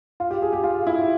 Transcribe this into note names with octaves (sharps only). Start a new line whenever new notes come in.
F4
G4
G#4
G4
F4
E4